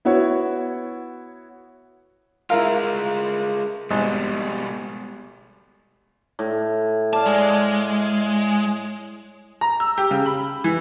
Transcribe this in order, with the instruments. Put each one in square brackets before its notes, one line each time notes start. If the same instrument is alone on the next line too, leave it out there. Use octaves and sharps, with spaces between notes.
[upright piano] B3 E4 F#4 C#5
[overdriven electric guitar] G#3 F4 [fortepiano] E4 A#4 F5
[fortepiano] G#1 [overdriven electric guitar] B2 G3
[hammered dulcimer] A2
[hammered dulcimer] D5 F5 [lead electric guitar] A5
[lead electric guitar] G#3
[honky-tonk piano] A#5
E6
G4
C#3
B5
E3